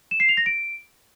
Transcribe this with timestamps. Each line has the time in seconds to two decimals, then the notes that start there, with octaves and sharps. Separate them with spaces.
0.11 E7
0.20 C7
0.29 F7
0.37 A#6
0.46 D7